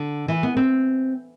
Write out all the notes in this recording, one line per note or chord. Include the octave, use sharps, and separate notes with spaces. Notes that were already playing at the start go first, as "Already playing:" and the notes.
Already playing: D3
E3
B3
C4